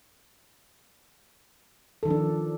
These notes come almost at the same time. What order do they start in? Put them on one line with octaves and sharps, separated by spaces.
A4 D#3 F3 D4